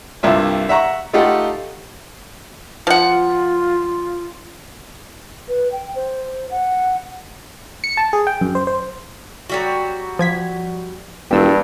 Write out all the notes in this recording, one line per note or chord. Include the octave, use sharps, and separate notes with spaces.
C2 G2 F4 E5
E5 F#5 A#5 C#6
A3 D#4 F4 G4 A4 F#5
F3 F4 F#5
B4
G5
C5
F#5
C#7
A5
G#4
G5
F#2
C5
C5
F#3 G3 F#4
F3 G#6 B6
E1 G2 G4 E6